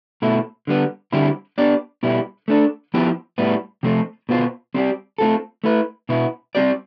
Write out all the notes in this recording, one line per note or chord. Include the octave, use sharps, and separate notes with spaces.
B2 A3 E4
D3 G3 B3
D3 G3 C4 E4 G4
B3 D4 G4 D5
B2 G3 B3 E4 G4
A3 D4 A4
F3 B3 E4 G4
A2 G3 B3 E4
C3 F3 A3 C4
B2 B3 F4 C5
G3 C4 G4 D5
A3 C4 F4 A4
A3 E4 B4
B2 B3 E4
G3 C4 G4 D5